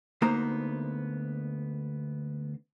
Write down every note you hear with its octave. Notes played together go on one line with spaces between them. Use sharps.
D2 A#3 B3 D#4 C5 A#5